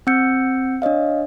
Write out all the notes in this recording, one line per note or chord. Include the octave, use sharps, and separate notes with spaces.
C4 F#5 E6 G6 C#7
D4 C#5 D#5 F5